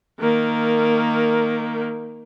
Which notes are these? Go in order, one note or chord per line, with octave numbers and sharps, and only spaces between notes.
D#3 A#3